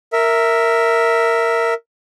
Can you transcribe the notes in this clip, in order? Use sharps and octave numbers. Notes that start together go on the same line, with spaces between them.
A#4 E5